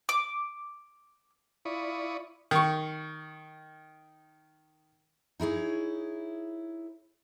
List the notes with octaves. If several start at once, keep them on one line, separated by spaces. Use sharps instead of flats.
D6
E4 F4 D5 B5 C#6 D#6
D#3 C#6
D#4 E4 G#4 C#5